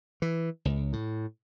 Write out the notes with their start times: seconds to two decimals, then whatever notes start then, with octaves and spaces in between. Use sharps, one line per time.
0.22 E3
0.65 C#2
0.93 A2